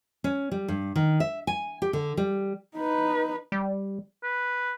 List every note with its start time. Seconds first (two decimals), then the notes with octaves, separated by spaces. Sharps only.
0.24 C#4
0.51 G3
0.68 G2
0.96 D#3
1.20 E5
1.47 G#5
1.82 G4
1.93 D3
2.17 G3
2.76 D#4 B4
3.52 G3
4.23 B4